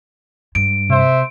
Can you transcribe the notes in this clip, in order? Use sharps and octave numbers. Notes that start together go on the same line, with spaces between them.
G2 D7
C3 C5 E5